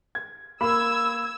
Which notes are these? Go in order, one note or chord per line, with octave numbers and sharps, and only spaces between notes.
G#6
A#3 B5 E6 G#6